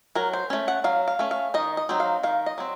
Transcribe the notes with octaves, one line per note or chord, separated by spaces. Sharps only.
F#3 A#4
C5
A3 C#4
F#5
F#3 F5
F5
A3 C#4
F5
D#3 D#5
D#5
F#3 C4 D#4
F5
D#3 F5
D#5
F#3 C4